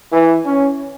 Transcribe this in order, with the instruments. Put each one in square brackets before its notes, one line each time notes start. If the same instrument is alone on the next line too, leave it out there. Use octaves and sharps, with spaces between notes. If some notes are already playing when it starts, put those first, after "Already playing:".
[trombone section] E3
C#4